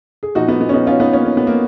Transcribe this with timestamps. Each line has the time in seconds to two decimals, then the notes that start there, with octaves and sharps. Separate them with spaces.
0.23 G#4
0.35 A#2 F3 D#4 F#4
0.48 B3 D#4
0.61 B3 D#4
0.69 C#4
0.74 B3 D#4
0.87 C#4 F4
1.00 B3 D#4
1.13 A#3 C#4
1.25 C#4
1.37 B3
1.47 A#3